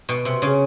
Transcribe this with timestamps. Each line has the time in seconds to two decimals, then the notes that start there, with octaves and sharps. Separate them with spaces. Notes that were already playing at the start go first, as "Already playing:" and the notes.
0.09 B2
0.25 C3
0.42 C#3